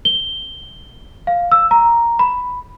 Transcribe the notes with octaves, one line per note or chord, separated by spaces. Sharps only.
G7
F5
E6
A#5
B5